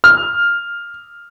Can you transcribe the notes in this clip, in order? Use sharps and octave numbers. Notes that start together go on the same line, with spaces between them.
F6